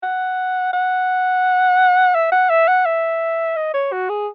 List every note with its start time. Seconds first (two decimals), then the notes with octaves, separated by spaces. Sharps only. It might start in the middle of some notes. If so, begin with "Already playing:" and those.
0.03 F#5
0.73 F#5
2.15 E5
2.32 F#5
2.50 E5
2.68 F#5
2.86 E5
3.56 D#5
3.74 C#5
3.92 F#4
4.09 G#4